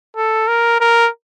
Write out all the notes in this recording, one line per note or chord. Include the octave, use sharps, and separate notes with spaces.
A4
A#4
A#4